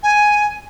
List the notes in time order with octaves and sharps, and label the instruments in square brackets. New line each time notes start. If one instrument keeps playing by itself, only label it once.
[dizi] G#5